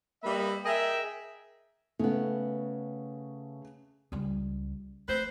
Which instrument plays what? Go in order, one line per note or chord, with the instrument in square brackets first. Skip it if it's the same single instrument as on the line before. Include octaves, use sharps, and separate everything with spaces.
[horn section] G3 A#3 B4 D#5 E5
G#4 A#4 D#5 E5 G5
[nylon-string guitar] C#3 B3 [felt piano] A3 C#4
[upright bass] C#2 G3
[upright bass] A3 [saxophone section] B4 C5